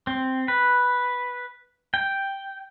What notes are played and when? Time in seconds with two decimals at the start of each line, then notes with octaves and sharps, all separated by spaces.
0.07 C4
0.48 B4
1.94 G5